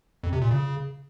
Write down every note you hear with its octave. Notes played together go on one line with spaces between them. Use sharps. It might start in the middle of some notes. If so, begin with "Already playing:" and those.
F2
C3
A#2
C#3